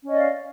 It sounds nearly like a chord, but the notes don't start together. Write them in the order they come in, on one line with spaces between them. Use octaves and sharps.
C#4 D#5 D5 F5